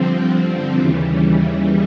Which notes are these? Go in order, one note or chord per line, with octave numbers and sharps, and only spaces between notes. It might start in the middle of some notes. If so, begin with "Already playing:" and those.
Already playing: G2 D3 F3 C4
C4
D#2 C#3 E3 G3